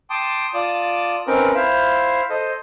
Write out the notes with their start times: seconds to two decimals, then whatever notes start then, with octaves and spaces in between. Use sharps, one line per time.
0.10 G5 A5 C6 D6 D#6
0.54 F4 D5 A5 D6 D#6
1.27 C4 C#4 D#4 A#4 B4 G5
1.54 E4 C5 E5 F5
2.30 A4 C5 D#5